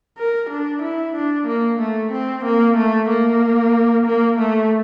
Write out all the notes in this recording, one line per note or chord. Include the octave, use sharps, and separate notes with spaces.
A#4
D4
E4
D4
A#3
A3
C4
A#3
A3
A#3
A#3
A3